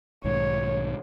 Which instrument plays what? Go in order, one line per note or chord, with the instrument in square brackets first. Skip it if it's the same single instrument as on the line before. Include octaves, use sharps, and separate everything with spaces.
[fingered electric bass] B1 G#2 D#3 [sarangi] C#5